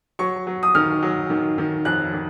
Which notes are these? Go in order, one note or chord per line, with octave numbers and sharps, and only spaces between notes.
F#3 C#6
F#3
D#6
D#3 F6
F#3
D#3
D#3
F2 F#6
D#3